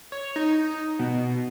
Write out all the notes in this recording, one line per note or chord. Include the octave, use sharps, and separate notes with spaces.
C#5
D#4
B2